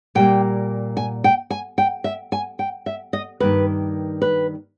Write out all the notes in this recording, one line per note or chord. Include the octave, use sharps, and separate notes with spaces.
A#2 G3 A#3 G5
G#5
G5
G#5
G5
E5
G#5
G5
E5
D#5
G2 D#3 A#3 B4
B4